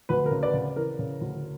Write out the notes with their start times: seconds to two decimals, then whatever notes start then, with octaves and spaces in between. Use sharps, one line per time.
0.09 D2 B4
0.26 A#4
0.31 C#3
0.43 B4 D5
0.54 C#3
0.76 E3 A#4
0.99 C#3
1.21 D2